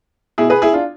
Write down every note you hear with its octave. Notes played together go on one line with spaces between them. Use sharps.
B2 E4 G#4
G#4 B4
E4 G#4
D4 F4